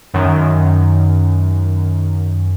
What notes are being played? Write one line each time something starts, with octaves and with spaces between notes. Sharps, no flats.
F#2 D#3